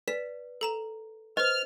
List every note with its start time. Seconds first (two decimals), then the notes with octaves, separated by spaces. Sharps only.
0.08 B4 D5 B6 E7
0.61 A4 A#5 E7
1.37 B4 C5 D#5 F6